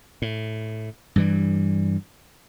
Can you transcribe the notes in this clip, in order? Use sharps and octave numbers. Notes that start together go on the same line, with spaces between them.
A2
G2 E3 G3